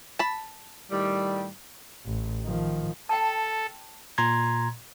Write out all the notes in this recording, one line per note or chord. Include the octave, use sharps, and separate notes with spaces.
A5 B5
A2 D#3 G3
A1
D#3 F3
A4 G5 A5
A#2 A#5 C6 G#6